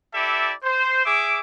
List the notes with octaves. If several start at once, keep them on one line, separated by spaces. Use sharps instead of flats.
E4 G4 A4 D5 E5
C5
G#4 E5 D6